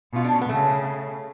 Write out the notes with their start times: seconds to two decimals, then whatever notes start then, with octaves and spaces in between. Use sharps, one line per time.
0.13 B2 F4
0.24 D4
0.33 C#4
0.41 B3
0.49 C#3 A3